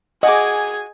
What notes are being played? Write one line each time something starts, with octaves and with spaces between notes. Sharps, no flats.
F#4 G#4 D#5 G#5 D6